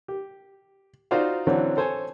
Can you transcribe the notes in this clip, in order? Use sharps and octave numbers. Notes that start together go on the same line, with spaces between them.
G4
D#4 F4 F#4 C5 D5 F5
D3 E3 F#3 C4 C#4
A4 C5 C#5 G#5